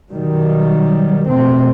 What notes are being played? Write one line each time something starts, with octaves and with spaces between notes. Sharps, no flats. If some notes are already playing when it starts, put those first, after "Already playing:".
B2 D#3 F#3 G3
F2 B2 A3 C4